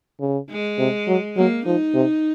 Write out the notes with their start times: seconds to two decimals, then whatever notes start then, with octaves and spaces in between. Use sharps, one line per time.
0.20 C#3
0.50 G#3
0.79 C3
1.08 F#3
1.37 F#3 A#3
1.66 F3 D#4
1.95 C3